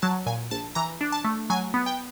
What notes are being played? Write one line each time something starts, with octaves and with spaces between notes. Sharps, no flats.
F#3 A5
A#2 G#5
A#1 A5
E3 A#5
D4
A5
A3
F#3 G#5
B3
G5